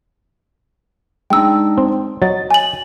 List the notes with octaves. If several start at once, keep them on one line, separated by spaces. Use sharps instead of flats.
G#3 D4 D#4 G5 E6
C4
F#3 D#5 A6
G#5 F#7